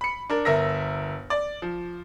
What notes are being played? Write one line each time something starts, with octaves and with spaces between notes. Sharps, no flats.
B5 C#7
D4 A#4
G1 A#4 E5 A#6
D5
F3